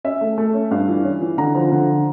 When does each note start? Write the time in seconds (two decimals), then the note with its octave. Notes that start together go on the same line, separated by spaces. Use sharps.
0.04 C#4 E5
0.21 A3
0.38 A3
0.54 C#4
0.71 G2 F5
0.88 E3
1.05 C#4
1.21 E3
1.38 D3 A#5
1.55 F3
1.72 D3